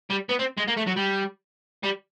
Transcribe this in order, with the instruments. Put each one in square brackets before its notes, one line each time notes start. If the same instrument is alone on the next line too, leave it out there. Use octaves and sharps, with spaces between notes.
[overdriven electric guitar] G3
B3
C4
G#3
A#3
A3
F#3
G3
G3